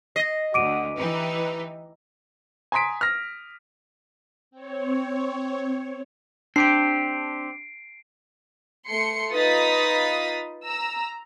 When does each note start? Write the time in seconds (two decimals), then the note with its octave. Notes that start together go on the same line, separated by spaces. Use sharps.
0.16 D#5 A#6 C7
0.54 D2 F#4 D6 D7 D#7
0.96 E3 D#4 G4 B4
2.72 G#5 A#5 C6 D#6 B6 D7
3.01 F6 A#6
4.51 C4 C#5
6.56 C4 D4 G4 C7 D7
8.89 A3 C6 C#7
9.34 D#4 F4 B4 D#6 A6 B6
10.64 A#5 E6